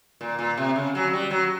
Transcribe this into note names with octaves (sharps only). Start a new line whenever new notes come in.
A#2
A#2
C3
C#3
F#3
G3
F#3